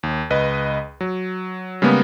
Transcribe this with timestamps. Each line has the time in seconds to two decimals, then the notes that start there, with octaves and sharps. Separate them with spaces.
0.03 D#2
0.30 C#2 B4 D#5
1.01 F#3
1.82 C#3 G3 G#3 A#3 B3